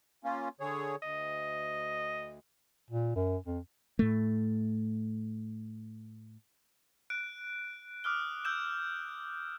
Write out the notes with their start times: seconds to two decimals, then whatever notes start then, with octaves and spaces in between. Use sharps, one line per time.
0.24 A#3 C#4 F4
0.60 D3 G#4 C#5
1.02 D2 D#5
2.90 A#2
3.15 F#2
3.46 F2
3.99 A2 A3
7.10 F#6 D7
8.04 D6 D#6 F6 F#6 G7
8.45 E6 G6 E7